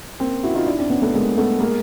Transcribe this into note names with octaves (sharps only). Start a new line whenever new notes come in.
A#3 C4
E4 F#4
D#4 F4
D4 E4
C4 D4
B3 C#4
A3 B3
G#3 A#3
A3 B3
G#3 A#3